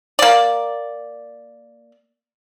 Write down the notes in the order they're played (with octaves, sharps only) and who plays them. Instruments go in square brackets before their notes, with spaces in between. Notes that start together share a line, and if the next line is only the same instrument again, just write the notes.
[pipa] A#3 D5